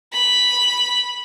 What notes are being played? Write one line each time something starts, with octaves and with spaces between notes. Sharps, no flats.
B5